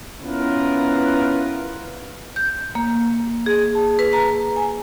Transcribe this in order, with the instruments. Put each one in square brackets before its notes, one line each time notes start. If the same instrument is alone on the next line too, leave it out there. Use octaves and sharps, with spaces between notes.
[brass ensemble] B3 C#4 E4 F4 A#4 B4
[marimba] G6
A#3
G#4
A5
B4
A#5
G#5